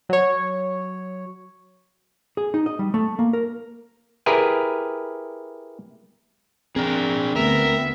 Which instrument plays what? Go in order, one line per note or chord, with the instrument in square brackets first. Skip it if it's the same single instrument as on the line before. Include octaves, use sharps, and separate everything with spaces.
[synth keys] F#3 C#5
[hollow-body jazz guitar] G#4
D#4
D#5
G3
A3
A#3
A#4
[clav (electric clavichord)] E4 G4 G#4 A#4 B4
[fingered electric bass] C4 [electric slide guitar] D4 G#4 [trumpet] A#4
[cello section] D2 B3 [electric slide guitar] A#4 [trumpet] E5